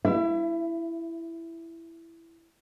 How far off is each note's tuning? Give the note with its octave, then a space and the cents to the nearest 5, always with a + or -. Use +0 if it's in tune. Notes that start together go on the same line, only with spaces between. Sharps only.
E4 +10 E5 +35